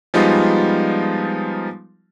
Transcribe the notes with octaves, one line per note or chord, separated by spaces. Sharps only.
F3 G3 G#3 B3 D#4 F4